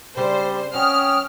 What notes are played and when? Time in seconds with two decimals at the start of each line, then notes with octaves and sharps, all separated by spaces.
0.17 C#3 G3 C4 D4 C5
0.74 F#3 C#4 G5 D#6 F6